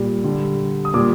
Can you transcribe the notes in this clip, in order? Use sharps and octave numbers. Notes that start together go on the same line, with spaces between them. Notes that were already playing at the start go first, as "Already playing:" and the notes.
Already playing: A#2 G3
D3 G3
D#6
A#2 G3 D6